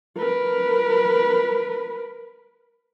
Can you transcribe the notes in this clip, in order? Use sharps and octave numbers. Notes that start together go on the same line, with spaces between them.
A#4 B4